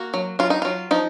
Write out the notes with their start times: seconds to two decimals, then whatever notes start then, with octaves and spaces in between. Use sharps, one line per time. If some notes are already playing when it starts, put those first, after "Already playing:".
Already playing: A#3 F#4
0.14 F#3
0.39 F#3 F4
0.50 D#4
0.62 F#3 F4
0.91 F3 D#4